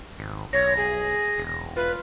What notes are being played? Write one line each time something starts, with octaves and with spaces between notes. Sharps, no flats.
G#1
B1 C#5 A#6
G#4
E1
F4 B4